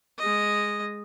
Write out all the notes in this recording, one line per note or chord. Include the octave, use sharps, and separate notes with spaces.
G#3 D#5